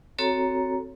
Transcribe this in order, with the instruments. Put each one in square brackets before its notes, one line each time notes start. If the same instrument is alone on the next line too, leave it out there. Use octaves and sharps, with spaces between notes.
[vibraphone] C4 F#4 A4 C#5 A#5